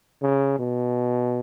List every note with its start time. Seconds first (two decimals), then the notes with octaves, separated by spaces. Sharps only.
0.22 C#3
0.59 B2